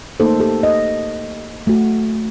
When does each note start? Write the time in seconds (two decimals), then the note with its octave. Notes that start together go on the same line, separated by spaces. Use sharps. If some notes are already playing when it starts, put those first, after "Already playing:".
0.20 A3 A#3 D#4 A4 C5
0.40 G4 A4
0.63 D#5
1.67 A3 F#4